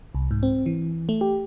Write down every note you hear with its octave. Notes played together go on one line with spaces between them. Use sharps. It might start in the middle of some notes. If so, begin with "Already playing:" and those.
C2
G#2
C4
E3
A3
G4